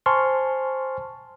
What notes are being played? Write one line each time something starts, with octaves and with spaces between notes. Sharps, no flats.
C5 G#5 A5 C6 C#6 F6